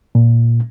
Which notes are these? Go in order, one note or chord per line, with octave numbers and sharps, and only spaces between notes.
A#2